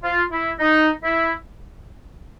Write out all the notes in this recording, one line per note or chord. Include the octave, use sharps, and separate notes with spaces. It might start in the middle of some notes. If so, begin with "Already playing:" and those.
F4
E4
D#4
E4